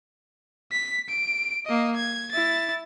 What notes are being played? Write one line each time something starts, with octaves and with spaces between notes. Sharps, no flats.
B6
D7
A#3 D#5
G#6
E4 A6